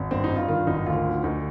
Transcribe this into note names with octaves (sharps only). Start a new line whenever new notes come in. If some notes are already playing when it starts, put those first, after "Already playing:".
Already playing: G#1
G2 C4
D#4
G2
F4
D#3 F4
G#1 D#4
D2 F4
D3
D2 D#4